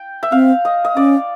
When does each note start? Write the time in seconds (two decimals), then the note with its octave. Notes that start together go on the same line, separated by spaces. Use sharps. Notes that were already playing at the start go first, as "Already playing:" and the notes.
Already playing: G5
0.23 E5
0.32 C4 F5
0.65 D#5
0.85 D#5
0.96 C#4 D5